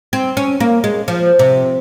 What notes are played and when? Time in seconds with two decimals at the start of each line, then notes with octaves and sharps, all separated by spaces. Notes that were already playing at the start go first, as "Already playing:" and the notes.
0.13 C4
0.37 C#4
0.60 A#3
0.84 G#3
1.08 F3
1.39 C3